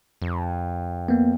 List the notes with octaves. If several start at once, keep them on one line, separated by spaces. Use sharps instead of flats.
F2
A#3 B3